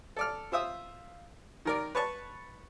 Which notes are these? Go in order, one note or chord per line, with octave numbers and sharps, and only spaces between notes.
A4 D5 F6
F4 C5 E5 D#6 E6
D#3 A#4 D5
B4 C#5 A5 C#6